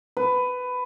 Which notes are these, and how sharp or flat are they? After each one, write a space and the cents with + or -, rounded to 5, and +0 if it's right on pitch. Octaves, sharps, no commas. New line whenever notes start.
B4 +15